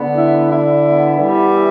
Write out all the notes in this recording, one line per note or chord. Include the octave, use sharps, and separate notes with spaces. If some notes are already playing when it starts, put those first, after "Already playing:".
Already playing: D3 B3
E4
E4
B3
E3 G3
E4